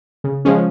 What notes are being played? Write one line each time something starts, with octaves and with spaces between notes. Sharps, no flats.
C#3
F3 G#3 C#4